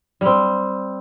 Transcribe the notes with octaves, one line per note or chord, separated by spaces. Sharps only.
G3 C4